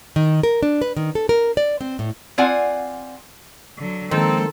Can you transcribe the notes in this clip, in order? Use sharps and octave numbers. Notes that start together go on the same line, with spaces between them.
D#3
A#4
D4
B4
D#3
A4
A#4
D5
C4
A2
C4 F4 D5 F#5 G#5
D3 F#3
D#3 F3 G#3 A#3 C4 A4